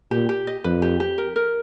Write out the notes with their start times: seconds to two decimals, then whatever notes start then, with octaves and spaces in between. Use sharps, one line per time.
0.11 A#2 G4
0.29 G4
0.47 D#5
0.64 F2 B4
0.82 G4
1.00 G4
1.18 A#4
1.36 A#4